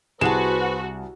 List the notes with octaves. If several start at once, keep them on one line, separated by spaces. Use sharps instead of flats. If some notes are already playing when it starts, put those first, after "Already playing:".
C2 F#4 G#4 B4 C5 A5 E7